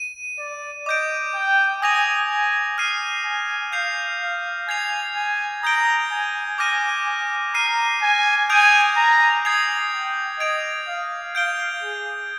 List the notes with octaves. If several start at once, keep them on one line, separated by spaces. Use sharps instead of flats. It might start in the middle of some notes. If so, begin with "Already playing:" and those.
Already playing: D#7
D5
D#5 D6 G6 D7
G5
G#5 D#6 A#6 F7
G#5
F6 C7 D#7
G#5
F5 G6 C7 F7
F5
G#5 G#6 C7 F7
G#5
A#5 D#6 G6 D7 G7
G#5
G#5 D6 F6 A#6 D#7
G#5
A#5 F6 C7 D#7
G#5
G#5 D#6 G6 D7 F7
A#5
G#5 D#6 G#6 C7 F7
G5
D#5 G#6 D7 F7
F5
F5 G6 D7 G7
G#4